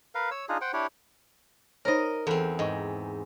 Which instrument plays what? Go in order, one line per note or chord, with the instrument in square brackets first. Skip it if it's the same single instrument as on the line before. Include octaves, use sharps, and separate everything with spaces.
[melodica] A#4 B4 F5
C#5 E6
D4 D#4 F4 G#4
C5 F#5 G5
D4 E4 G4 C#5
[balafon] D#4 C5 C#5 [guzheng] A#4 D#5
[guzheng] E2 C4 [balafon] A4
[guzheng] G#2 [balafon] D#5 C#6